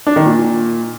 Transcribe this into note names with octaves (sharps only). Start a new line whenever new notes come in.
D4
D#3
A#2